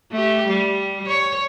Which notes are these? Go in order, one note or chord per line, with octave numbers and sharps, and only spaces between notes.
A3 G4
G3
C#5